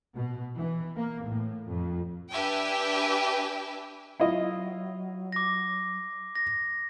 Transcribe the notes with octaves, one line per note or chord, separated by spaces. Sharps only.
B2
E3
A#3
A2
F2
D4 G4 B4 E5 G5 G#5
F#3 E4 F4 D#5
D6 A#6
A#6